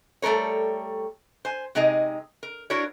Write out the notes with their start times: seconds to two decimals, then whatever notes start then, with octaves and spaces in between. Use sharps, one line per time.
0.22 G3 A3 A4 A#4 C#5
1.45 C5 G#5
1.75 C3 G#3 D#4 G#4 D#5
2.43 A#4
2.70 D4 E4 F#4 A#4 C#5